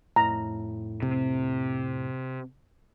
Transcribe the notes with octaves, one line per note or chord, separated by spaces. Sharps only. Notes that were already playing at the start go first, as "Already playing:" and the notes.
F2 A2 A#5
C3